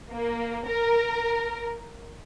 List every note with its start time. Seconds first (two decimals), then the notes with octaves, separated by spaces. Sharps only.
0.10 A#3
0.66 A#4